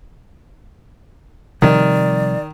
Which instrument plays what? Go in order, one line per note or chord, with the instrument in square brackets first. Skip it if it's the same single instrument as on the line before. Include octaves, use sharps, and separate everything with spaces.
[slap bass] C3 F3 G3 [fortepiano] D#3 [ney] D5